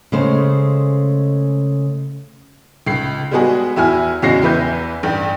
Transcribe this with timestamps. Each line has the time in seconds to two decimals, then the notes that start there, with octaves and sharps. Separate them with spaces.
0.12 C#3 G#3 A3 C5
2.87 C#2 C7
3.31 G3 G#3 B3 F#4 G#4
3.76 E2 E4 F#4 G#5 F6
4.22 E2 C#3 G#3 F#4 A#6 C7
4.42 E2 E3 B4 E5 G6
5.03 A1 G2 G5